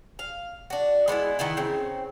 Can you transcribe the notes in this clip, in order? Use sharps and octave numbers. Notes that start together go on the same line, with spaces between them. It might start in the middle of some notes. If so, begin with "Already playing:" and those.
F5
D4 F#4
G#3 A3 B3 E4
D#3 E3 B3 E4
C#3 C4